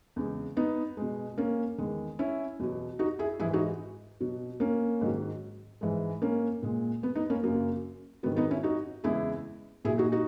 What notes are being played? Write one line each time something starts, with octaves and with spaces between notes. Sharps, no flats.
E2 C#3 G#3
B3 D#4
B2 G#3
A#3 C#4
E2 D#3 G#3
C#4 E4
E2 B2 F#3
D#4 F#4
E4 G#4
G#2 E3 G#3 E4 G#4
D#4 F#4
B2 F#3
A#3 C#4
G#2 D#3 F#3
G#2 E3 G#3
A#3 C#4
A#2 G#3
B3
B3 D#4
A#3 C#4
F#2 C#3 F#3 A#3
G#2 D#3 F#3 B3
B3 D#4
C#4 E4
D#4 F#4
E2 C#3 G#3 E4 G#4
A#2 F#3 E4 G#4
D#4 F#4
D#4 F#4